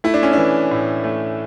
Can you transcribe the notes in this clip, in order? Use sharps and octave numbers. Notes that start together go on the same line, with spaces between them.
A3 E4
D4
C#4
E3 D4
A2
A3